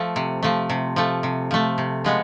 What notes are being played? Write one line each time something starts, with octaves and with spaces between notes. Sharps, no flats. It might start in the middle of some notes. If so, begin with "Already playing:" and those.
Already playing: F3 A3
C3
F3 A3
C3
F3 A3
C3
F3 A3
C3
F3 G#3 B3